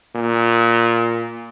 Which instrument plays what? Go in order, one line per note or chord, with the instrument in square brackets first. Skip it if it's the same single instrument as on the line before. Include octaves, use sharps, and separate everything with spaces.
[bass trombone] A#2